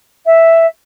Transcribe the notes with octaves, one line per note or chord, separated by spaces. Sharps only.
E5